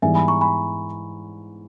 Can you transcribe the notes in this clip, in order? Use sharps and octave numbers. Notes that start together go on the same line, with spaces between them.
G#2 E3 G3 B3 E5 G#5
G#5 B5
A#5 C#6
G#5 B5